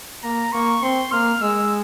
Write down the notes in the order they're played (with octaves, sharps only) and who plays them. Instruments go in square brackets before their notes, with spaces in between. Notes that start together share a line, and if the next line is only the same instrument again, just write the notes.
[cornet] A#3 [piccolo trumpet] A#5
[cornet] A#3 [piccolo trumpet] C#6
[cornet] C4 [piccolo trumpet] C6
[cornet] A#3 [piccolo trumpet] F6
[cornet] G#3 [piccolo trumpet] E6